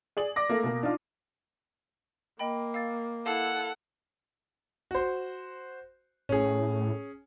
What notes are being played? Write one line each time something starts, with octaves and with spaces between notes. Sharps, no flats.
G#4 D5 F#7
D5 D6 A#6
A3 A#3
B2 A#3
D4 D#4 F4
A#3 D#5 G5 B5
F5 E6 A6
E4 A4 F5 F#5 A5 E6
F#4 C5
A2 C#4 G#4